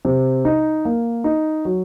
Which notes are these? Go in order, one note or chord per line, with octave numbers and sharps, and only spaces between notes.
C3
D#4
A#3
D#4
F#3